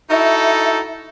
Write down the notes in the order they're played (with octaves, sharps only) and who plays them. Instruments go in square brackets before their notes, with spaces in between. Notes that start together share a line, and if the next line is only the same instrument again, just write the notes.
[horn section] D#4 F#4 A4 [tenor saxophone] E4 [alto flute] E5